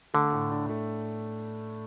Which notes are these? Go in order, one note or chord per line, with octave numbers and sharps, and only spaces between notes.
D3 A3
A2
D4
A3